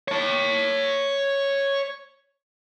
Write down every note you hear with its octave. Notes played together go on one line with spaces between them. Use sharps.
C#5 A5